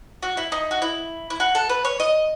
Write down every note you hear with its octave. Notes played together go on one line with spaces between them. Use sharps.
F#4
E4
D#4
F#4
E4
E4
F#4
A4
B4
C#5
D#5